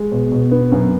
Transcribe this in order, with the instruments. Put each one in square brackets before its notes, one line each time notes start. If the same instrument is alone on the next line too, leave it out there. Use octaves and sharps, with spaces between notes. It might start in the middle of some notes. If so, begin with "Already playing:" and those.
Already playing: [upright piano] G#3
B2
B2
B3
F#2